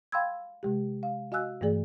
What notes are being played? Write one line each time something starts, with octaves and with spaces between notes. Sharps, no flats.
F5 G5 B5 C6 E6 G#6
C3 G#3 G4
F5
F#4 D#5 F5 G#5 E6 F#6
G2 E3 A3 G#4 D5